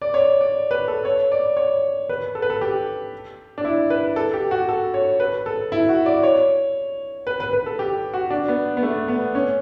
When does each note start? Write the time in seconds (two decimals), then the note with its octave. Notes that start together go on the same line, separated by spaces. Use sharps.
0.02 D5
0.14 C#5
0.41 D5
0.71 B4
0.88 A4
1.05 C#5
1.32 D5
1.57 C#5
2.09 B4
2.35 A4
2.42 B4
2.50 A4
2.61 G4
3.58 D4
3.65 E4
3.90 B4
4.16 A4
4.34 G4
4.51 F#4
4.69 A4
4.94 C#5
5.20 B4
5.46 A4
5.72 E4
5.89 F#4
6.06 D5
6.23 C#5
7.27 B4
7.40 B4
7.53 B4
7.66 A4
7.79 G4
8.14 F#4
8.30 D4
8.48 B3
8.77 B3
8.83 A3
9.08 B3
9.35 C#4